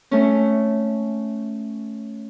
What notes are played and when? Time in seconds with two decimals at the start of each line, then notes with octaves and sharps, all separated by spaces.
0.11 A3 C#4